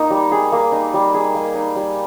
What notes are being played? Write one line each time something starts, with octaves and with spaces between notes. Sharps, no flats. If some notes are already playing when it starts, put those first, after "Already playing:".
Already playing: A#3 D#4
G3
G#4
A#3
D#4
G3
G#4
A#3
D#4
G3